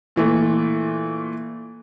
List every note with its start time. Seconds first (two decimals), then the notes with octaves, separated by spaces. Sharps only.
0.16 A#2 E3 A3